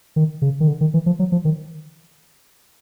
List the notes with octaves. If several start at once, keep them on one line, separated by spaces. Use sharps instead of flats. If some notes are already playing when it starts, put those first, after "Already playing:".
D#3
C#3
D#3
D3
D#3
E3
F3
F#3
F3
D#3